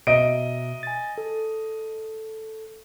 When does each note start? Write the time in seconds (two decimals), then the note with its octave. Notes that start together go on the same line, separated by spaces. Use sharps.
0.07 B2 D#5 E5 A#5 D7
0.83 G#5 A6
1.18 A4